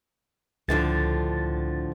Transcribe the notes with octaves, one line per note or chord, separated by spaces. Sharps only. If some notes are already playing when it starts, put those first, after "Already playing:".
C#2 A2 D3 F3 A6